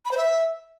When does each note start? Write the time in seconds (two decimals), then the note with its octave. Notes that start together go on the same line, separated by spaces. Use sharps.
0.05 B5
0.11 C5
0.17 E5